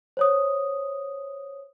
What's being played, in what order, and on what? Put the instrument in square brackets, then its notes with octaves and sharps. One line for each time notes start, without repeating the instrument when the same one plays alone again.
[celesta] C5 C#5 D#6